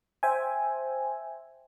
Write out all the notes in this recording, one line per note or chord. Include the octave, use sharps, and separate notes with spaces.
C5 E5 G5 G#5